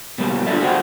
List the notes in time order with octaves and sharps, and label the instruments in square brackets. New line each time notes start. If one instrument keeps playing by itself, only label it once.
[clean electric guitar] B2 G3 A#3
D4 F4 G#4 A4 D5 E5
F#4 G#4 C5 C#5 F#5 G5